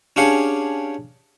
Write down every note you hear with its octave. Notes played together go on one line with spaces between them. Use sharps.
C#4 D4 G4 G#4 F5 F#5